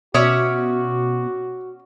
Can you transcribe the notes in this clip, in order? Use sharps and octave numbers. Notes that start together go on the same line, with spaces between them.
B2 C#4 F#4 C#5 D5 E5 D#6